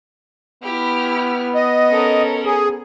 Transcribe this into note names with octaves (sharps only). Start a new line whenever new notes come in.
B3 E4 G4 F6
D#5
C#4 A4 A#4
G#4